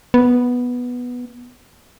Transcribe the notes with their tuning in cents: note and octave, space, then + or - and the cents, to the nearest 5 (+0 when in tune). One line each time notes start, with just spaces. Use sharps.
B3 -5